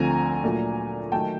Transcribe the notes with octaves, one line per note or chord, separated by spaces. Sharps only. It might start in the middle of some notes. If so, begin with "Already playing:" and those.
Already playing: D2 D3 F3 A3 C4 G#5 A#5
A#2 F#3 A3 D4
D#3 F#3 A3 G5 A5